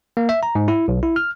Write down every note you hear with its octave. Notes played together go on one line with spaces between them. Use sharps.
A#3
E5
A#5
G#2
E4
B1
E4
F6